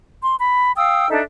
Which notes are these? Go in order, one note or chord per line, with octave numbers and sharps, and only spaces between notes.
C6
B5
F5 G5 D#6 E6
D4 D#4 A4 E5